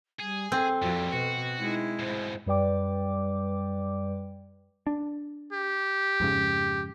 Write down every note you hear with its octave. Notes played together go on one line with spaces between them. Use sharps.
G3 G#4
C4 A4
F2 A#2 G3 F#4
B2 F#4
G#3 D#4 E4
G#2 B2 C5
F#2 G3 B4 D5 G5 D6
D4
G4
F2 G#2 C#3